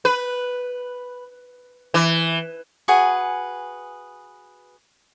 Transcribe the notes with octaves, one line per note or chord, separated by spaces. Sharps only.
B4
E3
F#4 G#4 B4 G#5